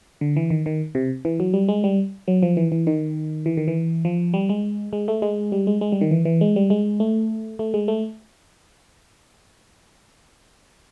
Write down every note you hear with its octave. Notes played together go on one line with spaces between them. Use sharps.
D3
E3
D#3
D#3
C3
E3
F#3
G3
G#3
G3
F#3
F3
E3
E3
D#3
E3
D#3
E3
F3
G3
G#3
G#3
A3
G#3
G3
G#3
G#3
G3
D#3
E3
E3
G#3
G3
G#3
A3
A3
G#3
A3